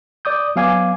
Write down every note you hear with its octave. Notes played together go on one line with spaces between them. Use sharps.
D5 D6 D#6 G6
F#3 B3 F5 G#5 D6 G#6